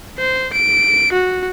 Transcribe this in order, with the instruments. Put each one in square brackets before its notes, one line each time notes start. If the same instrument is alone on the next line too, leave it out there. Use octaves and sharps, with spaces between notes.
[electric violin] C5
D7
F#4